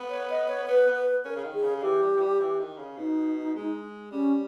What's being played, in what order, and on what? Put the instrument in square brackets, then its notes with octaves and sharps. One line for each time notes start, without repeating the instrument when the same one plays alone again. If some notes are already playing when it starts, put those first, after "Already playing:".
Already playing: [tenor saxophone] B3
[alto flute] C#5
D#5
C#5
[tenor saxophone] B3 [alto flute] B4
[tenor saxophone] B3
[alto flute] B4
[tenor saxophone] C#4 [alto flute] A#4
[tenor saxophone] C#3
D#3
[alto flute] G#4
[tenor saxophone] C#3
[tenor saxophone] E3 [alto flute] G4
[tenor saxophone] G3
E3
G3
E3
D#3
C#3
[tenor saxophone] B2 [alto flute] D#4
[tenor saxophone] G#3
[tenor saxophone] G3 [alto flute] C#4